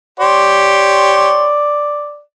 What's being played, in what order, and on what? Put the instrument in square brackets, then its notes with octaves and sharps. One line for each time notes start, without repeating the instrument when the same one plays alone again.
[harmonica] G4 C#5 C6 [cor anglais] D5